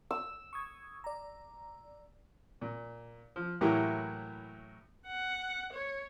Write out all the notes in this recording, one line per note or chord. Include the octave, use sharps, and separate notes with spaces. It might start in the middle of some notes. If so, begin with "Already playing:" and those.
E6
C#6 D#6 G#6
D5 A#5
A#2
F3
A2 E3 F#3 A#3 E4 G4
F#5
C#5